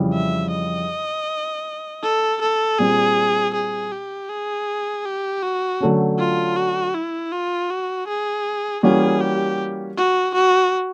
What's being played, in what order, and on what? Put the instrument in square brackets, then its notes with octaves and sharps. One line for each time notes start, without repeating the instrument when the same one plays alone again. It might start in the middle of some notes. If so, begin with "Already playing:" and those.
Already playing: [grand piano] F2 C#3 E3 G3
[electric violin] E5
D#5
A4
A4
[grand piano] A#2 G3 C4 [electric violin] G#4
[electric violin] G#4
G4
G#4
G4
F#4
[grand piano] D3 F#3 A3 C#4
[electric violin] F4
F#4
E4
F4
F#4
G#4
[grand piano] E3 G3 A#3 C#4 F#4 [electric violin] G#4
[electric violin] G4
F#4
F#4